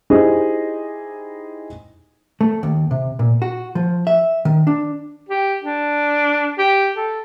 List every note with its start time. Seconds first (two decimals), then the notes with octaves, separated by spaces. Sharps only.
0.10 D#4 E4 G4 G#4 C5 D#5
2.41 A3
2.63 D#2
2.91 C3
3.19 A#2
3.42 F#4
3.75 F3
4.07 E5
4.45 D#3
4.67 D4
5.29 G4
5.63 D4
6.59 G4
6.96 A4